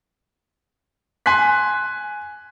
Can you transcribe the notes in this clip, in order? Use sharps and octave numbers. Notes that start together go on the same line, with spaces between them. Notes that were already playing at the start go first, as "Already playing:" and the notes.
G#5 C6 F#6 B6